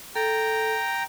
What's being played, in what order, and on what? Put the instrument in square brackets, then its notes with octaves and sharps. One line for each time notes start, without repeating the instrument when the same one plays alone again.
[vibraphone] A4 [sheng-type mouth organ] G5 A#5